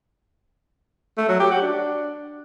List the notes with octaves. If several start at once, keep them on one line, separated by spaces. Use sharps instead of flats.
A3
F#3
G4
F#4
D4